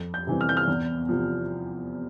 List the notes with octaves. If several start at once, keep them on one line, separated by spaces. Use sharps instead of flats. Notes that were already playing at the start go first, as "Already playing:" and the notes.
Already playing: F2
G6
C3 E3 G3 C4
F6
G6
F6
E2
C3 F3